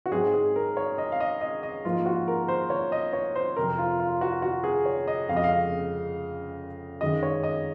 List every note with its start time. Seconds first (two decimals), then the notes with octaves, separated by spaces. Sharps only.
0.06 F#4
0.12 G#2 F#3 C4 G#4
0.34 G#4
0.56 A#4
0.77 C#5
0.98 D#5
1.12 F5
1.20 D#5
1.41 D#5
1.63 D#5
1.85 G#2 F3 A#3 F4
2.06 F#4
2.28 A#4
2.48 C5
2.70 C#5
2.92 D#5
3.13 C#5
3.35 C5
3.56 F2 C3 F#3 C4 A#4
3.78 F4
4.00 F4
4.21 F#4
4.42 F#4
4.64 G#4
4.86 C#5
5.08 D#5
5.29 F2 C#3 G#3 F5
5.37 D#5
5.44 F5
7.01 F#2 D#3 G#3 D#5
7.23 C#5
7.44 D#5